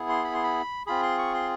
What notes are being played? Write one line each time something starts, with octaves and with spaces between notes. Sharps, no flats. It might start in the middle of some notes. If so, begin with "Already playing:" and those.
Already playing: B3 E4 G#4
C6
B5
C6
B5
C4 F4 G#4 B5
C6
C#6
C6